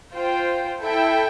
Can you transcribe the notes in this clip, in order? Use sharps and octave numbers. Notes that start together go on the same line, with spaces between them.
F4 C5 G5
E4 A4 E5 G5